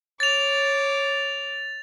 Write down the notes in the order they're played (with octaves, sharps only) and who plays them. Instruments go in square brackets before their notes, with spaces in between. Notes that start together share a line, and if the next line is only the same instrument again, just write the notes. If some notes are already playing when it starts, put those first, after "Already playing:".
[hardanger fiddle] C#5 D6 [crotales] A6 F7